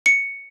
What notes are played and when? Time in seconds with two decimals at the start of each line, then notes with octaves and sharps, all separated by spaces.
0.06 C#7